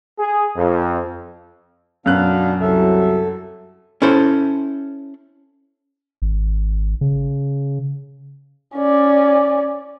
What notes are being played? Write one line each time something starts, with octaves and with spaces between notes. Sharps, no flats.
G#4
F2
F#2 B2 B3 D4 F5 F#6
C2 F#3 A4 E5
C#4 E4 A4 C5
G#1
C#3
C#4 D5